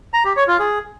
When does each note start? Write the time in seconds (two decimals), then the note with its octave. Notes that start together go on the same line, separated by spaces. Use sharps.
0.13 A#5
0.25 G4
0.36 C#5
0.48 F4
0.59 G#4